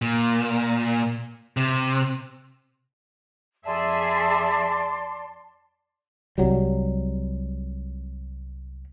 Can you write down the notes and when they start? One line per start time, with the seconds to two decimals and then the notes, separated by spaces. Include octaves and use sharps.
0.02 A#2
1.57 C3
3.66 F2 G#4 D5 E5 A5 C6
6.38 C2 F#3 G3